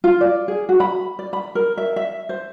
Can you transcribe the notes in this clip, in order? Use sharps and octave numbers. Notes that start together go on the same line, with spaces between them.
F4
D5
G#4
F#4
B5
D5
B5
A#4
E5
E5
C5